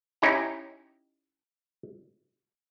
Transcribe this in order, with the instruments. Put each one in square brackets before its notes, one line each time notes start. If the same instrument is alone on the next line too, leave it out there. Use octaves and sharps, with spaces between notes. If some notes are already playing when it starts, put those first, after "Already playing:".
[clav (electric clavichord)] C#4 D#4 E4 G4 A#5